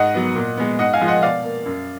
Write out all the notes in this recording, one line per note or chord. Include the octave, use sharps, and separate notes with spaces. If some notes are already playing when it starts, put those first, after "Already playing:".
Already playing: G#2 D#5 F#5
F#3 B3
A#2
G#3 B3
G#2 D#5 F#5
F5 G#5
F3 G#3
D#5 F#5
B2 D5 F5
A#3
F#2